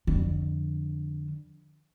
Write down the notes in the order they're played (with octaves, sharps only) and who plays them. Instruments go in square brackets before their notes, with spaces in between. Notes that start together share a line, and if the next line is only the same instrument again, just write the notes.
[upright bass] F2 D3